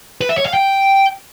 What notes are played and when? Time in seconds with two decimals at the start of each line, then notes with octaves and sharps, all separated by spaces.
0.21 B4
0.29 E5
0.37 C#5
0.46 F5
0.54 G5